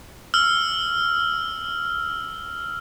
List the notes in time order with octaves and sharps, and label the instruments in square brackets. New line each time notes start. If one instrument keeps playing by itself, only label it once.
[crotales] E6 F6